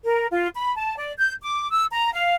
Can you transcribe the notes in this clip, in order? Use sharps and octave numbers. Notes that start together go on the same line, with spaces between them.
A#4
F4
B5
A5
D5
G6
D6
E6
A#5
F5